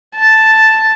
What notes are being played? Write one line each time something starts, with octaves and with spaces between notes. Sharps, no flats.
A5